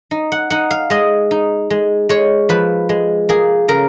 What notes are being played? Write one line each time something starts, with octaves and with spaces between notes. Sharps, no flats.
D#4
F#5
D#4 F#5
F5
G#3 D#5
D#4
G#3
G#3 C#5
F3 B4
G#3
A#3 G#4
C#3 A#4